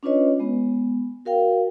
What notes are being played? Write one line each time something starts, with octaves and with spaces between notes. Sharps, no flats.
C#4 D4 F4 B4 C#5 D#5
G#3 B3
F#4 A#4 F5 G5